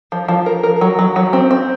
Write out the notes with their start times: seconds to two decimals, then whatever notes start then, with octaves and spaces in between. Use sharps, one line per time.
0.12 F3
0.28 F3
0.46 A#4
0.63 A#4
0.81 F#3
0.99 F#3
1.16 F#3
1.33 C4
1.51 C4